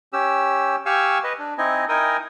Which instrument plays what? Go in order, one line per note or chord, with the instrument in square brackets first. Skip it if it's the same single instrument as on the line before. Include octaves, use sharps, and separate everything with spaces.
[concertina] C#4 G4 E6
G4 F5 G#5 C#6 E6
B4 D#5
D4
C4 D#4 E4 D#5 G#5
D#4 E4 A#4 G5 G#5 D#6